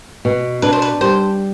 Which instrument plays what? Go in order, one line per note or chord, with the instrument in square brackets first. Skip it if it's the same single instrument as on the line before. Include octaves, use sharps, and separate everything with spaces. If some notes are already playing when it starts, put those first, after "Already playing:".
[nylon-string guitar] B2
[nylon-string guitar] D4 [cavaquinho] B4
[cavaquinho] C5
B4
[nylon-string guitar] G3 [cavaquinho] C5